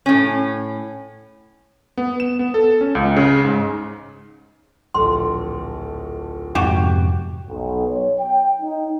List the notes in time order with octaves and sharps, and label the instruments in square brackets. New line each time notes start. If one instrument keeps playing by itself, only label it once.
[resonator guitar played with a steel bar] A2 C#4
[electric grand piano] B3
E7
B3
A4
C#4
C#2
C#3
G#2
[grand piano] D1 A#1 A4 [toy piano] C6
[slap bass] F2 G#2 C3 [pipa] F#4 G4
[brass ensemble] B1
C#5
G5
D#4